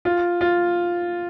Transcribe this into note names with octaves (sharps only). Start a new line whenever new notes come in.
F4
F4